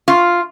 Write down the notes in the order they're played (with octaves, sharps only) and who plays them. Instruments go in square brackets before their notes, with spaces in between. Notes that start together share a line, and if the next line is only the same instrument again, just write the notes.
[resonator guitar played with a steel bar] F4